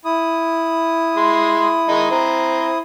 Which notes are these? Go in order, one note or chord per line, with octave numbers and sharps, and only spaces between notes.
E4 D#6
G#3 C6
D#3 G#3 D#4
C4 A#5